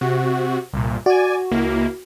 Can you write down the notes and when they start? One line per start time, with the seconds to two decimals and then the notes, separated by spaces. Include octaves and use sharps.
0.01 C3 F#4
0.73 C2 G2 A#2
1.06 F#4 D5 G#5
1.51 C#2 A#3 E4